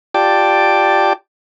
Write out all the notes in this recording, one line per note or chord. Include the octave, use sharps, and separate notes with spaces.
F4 G4 D5 G5 A5 D6